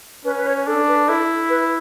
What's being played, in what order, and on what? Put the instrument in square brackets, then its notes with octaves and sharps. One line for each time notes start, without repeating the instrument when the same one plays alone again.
[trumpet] C#4 [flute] B4
[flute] B4
C#5
[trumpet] D4 [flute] A4
[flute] B4
[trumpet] E4 [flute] A4
[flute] B4